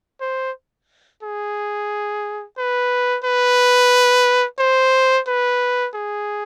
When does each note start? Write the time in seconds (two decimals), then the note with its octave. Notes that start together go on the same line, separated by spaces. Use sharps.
0.21 C5
1.23 G#4
2.58 B4
3.24 B4
4.59 C5
5.27 B4
5.94 G#4